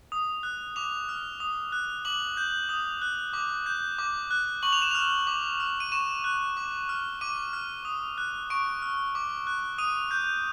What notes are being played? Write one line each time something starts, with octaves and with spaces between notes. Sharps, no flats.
D#6
F#6
D6 F7
F6
D#6
F#6
D6 F#7
G6
D#6
F#6
D6
G6
D6
F#6
C#6 F#7
F7
E7
F6 F7
D6
F6
D#7
C#6 E7
F#6
D6
F6
D6 D#7
F6
D#6
F#6
C#6 D7
F6
D6
F#6
D#6 D#7
G6